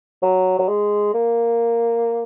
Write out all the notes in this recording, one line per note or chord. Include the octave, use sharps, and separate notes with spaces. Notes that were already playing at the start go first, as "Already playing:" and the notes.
F#3
F#3
G#3
A#3